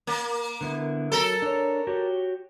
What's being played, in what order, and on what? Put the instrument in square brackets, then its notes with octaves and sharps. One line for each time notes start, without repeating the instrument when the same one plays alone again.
[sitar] A#3
[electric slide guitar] D3 B3 E4
[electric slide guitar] F#3 [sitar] A4 A#4
[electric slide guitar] D4 C#5
F#4 G4 C#5